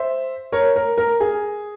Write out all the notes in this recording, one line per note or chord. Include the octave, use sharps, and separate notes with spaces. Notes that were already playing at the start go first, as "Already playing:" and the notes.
Already playing: C5 E5
A#4 C#5
A#4
A#4
G#4